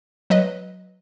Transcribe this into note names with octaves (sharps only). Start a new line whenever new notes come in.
F#3 B4 D#5